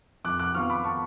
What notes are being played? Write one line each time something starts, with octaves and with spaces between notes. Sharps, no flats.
F2 D6 F#6
D6 F#6
F3 B3 F4 C#6 F6
B5 D6
A5 C#6